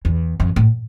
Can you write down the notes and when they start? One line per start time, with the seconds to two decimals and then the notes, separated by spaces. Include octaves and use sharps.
0.05 E2
0.40 F2
0.56 A2